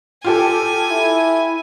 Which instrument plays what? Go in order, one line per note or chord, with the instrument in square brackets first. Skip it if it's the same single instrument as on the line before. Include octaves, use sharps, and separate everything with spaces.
[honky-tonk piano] F4 G4 A4 [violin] G#5
[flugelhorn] E4